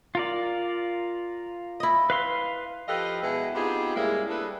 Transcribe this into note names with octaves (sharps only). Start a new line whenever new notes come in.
F4 A#4 D5
E4 D#5
B4 F5 C6
F3 G4 A4 B4 D#5 F5
B2 G#3 B3 E4 F#4 G#4
B3 C4 D#4 F4 G4 G#4
A2 C#3 G3 G#3 A#3 E4
G3 D4 E4 G#4 A4 B4